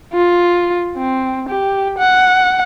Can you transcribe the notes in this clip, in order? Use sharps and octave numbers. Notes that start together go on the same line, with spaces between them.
F4
C4
G4
F#5